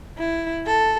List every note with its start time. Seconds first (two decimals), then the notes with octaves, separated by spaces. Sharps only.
0.18 E4
0.66 A4